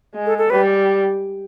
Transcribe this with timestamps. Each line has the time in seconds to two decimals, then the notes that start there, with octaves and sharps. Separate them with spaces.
0.15 G#3
0.26 A4
0.38 A4
0.50 G3 B4